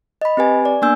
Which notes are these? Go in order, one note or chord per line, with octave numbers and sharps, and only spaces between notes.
D#5 B5
C4 G4 B4 G#5
D5
A#3 B3 D4 G#5 E6 G6